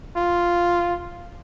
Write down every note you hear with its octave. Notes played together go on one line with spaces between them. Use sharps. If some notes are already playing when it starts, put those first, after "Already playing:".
F4